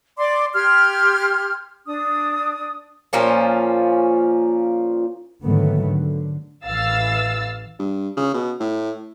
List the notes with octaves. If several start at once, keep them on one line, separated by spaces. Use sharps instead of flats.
D5 C6 D6
G4 C6 F6 G#6
D4 D#6
A#2 F3 A#3 C#4
G#2 D3 D#3 F#3 A3 B3
D3
A1 E3 F5 E6 A6
G2
C#3
B2
A2